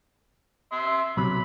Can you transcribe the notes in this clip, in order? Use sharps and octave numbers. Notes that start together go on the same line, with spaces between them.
E5 C6
B1 C3 F#3 B5